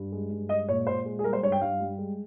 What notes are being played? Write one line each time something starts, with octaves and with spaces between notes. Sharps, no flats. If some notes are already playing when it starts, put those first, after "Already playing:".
Already playing: G2
G#3
G2
G#3 D#5
A#2 C#5
A#2 C5
G#3
G#4
G3 A#4
C5
G2 C#5
G5
G2 F5
G3
G#3